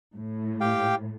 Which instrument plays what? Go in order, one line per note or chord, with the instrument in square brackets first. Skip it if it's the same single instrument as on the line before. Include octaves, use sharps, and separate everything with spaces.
[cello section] A2
[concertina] G4 F5 G5